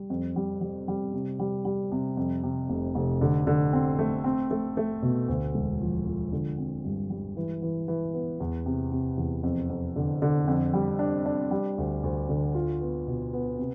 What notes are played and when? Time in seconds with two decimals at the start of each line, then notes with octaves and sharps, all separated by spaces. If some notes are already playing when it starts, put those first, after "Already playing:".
Already playing: G3
0.10 F2
0.36 G3
0.61 G3
0.88 G3
1.13 C3
1.39 G3
1.65 G3
1.92 C3
2.17 F2
2.44 C3
2.69 F1
2.95 F1
3.21 D3
3.47 D3
3.73 C4
3.99 A3
4.24 C4
4.51 A3
4.77 A3
5.02 B2
5.28 D2
5.55 E1
5.81 F3
6.07 F3
6.32 D3
6.58 C4
6.85 G2
7.10 G3
7.37 E3
7.62 E3
7.88 E3
8.14 B3
8.40 E2
8.66 C3
8.92 C3
9.18 E2
9.43 F2
9.69 F2
9.96 D3
10.22 D3
10.47 F2
10.73 G3
10.99 D4
11.26 D4
11.51 G3
11.78 D2
12.03 D2
12.29 D3
12.55 F4
12.81 B3
13.07 B2
13.33 B3
13.59 C3